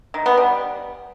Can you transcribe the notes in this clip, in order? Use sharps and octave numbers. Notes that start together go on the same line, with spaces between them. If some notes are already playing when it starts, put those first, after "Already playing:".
D#3
B3
G3